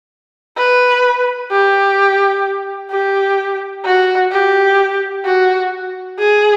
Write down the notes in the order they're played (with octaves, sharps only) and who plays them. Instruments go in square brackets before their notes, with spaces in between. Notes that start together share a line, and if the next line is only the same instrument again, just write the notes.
[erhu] B4
G4
G4
F#4
G4
F#4
G#4